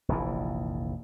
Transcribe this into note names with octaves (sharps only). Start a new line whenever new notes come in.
F1 A#1 D#2 E3